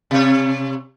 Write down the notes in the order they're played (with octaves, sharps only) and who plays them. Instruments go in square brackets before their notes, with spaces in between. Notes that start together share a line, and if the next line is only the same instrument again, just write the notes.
[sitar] C3 C#5